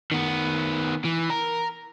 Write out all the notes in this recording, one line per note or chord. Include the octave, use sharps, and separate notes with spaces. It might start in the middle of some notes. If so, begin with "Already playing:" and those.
D#3 B3
E3
A#4